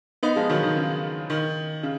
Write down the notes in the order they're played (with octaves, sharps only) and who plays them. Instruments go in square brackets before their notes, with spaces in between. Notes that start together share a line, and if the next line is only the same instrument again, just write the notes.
[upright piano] B3 D#4
F3 G#3
D#3 F#3
D#3
C#3
D#3
C#3